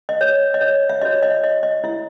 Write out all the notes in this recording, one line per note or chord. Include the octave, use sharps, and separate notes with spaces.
D#5
C#5
D#5
C#5
E5
F#4 C#5 D#5
D#5
D#5
D#5
E4 E5